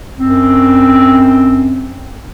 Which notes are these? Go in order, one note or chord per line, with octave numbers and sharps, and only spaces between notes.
F#2 C4